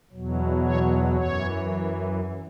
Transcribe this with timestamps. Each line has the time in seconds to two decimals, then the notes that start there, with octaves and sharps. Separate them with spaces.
0.12 E2 B2 F#3
0.63 C#5
1.15 F#2 E3 C#5